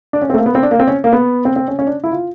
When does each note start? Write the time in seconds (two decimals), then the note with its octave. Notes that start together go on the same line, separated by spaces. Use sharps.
0.13 D4
0.22 C#4
0.30 C4
0.34 A3
0.38 A#3
0.46 B3
0.55 C4
0.63 D4
0.71 A#3
0.80 C4
0.88 C#4
1.04 A#3
1.13 B3
1.45 C4
1.56 C4
1.68 C#4
1.79 C#4
1.87 D4
2.04 E4
2.12 F4